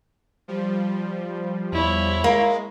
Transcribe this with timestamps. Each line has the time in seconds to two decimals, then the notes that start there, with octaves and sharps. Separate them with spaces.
0.48 F3 G3
1.73 E2 E4 C#5
2.24 G#3 A#3